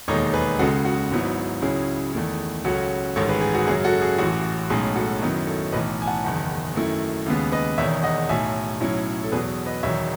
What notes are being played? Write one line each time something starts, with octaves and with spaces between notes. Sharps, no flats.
E1 D#2 D#3 G#3 D#4 A4 C#5
G#4 B4
C#2 C#3 G#3 F#4 A4
F#4
G#1 G#2 F#3 B3 E4
C#2 C#3 F#3 C#4 E4 G#4
E2 D#3 A3 E4
C#2 C#3 F#3 C#4 F#4 A4
A1 G#2 D#3 A4 C#5
G#4 B4
G#4
F#4
F#2 C#3 F#3 G#4
F#4 A4
G#4
A1 A2 E3 F#4
B1 A2 G#3 C#4 G#4
F#4 A4
F#2 D#3 F#3 B3 E4
A4 C#5
B1 A2 E3 B4 D#5
G#5
F#5 A5
F#1 E2 D#3
F#2 D#3 A3 E4
D#2 C#3 G#3 B3
B4 D#5
E1 E2 D#3 C#5 E5
D#5 F#5
B1 A2 F#3 E5 G#5
B1 A2 F#3 C#4 E4
A4
E2 B2 F#3 G#4 B4
B4 D#5
E1 E2 D#3 F#3 C#5 E5